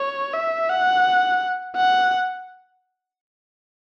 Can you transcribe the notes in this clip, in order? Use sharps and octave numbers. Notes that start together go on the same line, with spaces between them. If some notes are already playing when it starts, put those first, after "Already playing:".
Already playing: C#5
E5
F#5
F#5